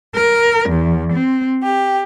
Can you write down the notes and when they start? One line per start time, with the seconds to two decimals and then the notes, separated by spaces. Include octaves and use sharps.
0.14 A#4
0.68 E2
1.12 C4
1.62 G4